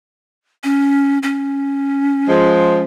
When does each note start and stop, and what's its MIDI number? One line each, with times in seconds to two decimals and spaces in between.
0.64 1.18 61
1.23 2.83 61
2.29 2.84 53
2.29 2.84 56